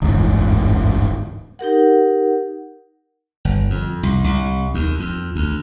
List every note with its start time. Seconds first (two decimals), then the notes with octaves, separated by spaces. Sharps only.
0.02 D1 G1 E2 G#2
1.59 D#4 G4 A#4 F#5
3.45 G1
3.70 F2
4.03 C2
4.24 C2
4.74 D#2
5.00 F2
5.36 D2